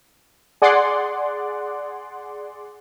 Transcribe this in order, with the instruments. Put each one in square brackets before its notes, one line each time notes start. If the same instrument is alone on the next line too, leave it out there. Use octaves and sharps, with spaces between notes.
[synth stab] G#4 D5 F#5 C6